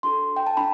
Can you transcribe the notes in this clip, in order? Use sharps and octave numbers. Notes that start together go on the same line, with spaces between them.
D4 F#4 A4 C6
G5
A5
D4 B5